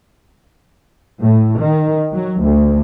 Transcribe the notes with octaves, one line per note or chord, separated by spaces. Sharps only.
A2
D#3
F#3
D2